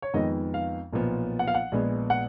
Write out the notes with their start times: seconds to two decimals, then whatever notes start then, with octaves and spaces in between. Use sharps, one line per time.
0.02 C#5
0.14 F2 D#3 G#3 B3 D#5
0.54 F5
0.93 B1 A#2 F3 B3
1.39 F#5
1.48 F5
1.54 F#5
1.72 A#1 A#2 G#3 B3
2.10 F#5